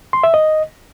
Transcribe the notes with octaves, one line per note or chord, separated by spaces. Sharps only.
C6
E5
D#5